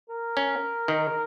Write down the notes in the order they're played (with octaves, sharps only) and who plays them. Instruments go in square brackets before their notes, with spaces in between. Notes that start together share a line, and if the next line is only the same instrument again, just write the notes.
[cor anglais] A#4
[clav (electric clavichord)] C#4
D#3